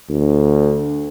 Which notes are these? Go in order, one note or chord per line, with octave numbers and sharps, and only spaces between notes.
D2